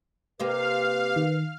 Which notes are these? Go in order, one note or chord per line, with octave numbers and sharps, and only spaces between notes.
C3 A#3 G4 B4 F5
D#3